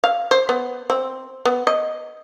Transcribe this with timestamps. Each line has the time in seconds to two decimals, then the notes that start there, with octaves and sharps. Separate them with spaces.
0.04 F5
0.31 C5
0.49 B3
0.90 C4
1.45 B3
1.67 D#5